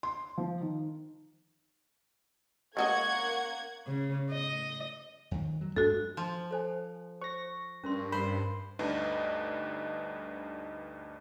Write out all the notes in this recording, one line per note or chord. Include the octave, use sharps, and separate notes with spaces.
C6
F3
D#3
G#3 A#3 F#4 C#5 D#5 F#5 G#6
C#3
D#5
F2 D#3
F#3
G2 G#3 D4 F#4 A4
F3
A4 C5 G#5
C5 C#6 A#6
G2 C#4 A#4 C6
A#4 C5 B5
D2 G2 D4 D#4 B4 D#5